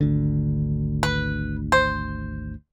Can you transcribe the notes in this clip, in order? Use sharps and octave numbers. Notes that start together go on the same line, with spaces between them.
G#1 D2 D3
B4
C5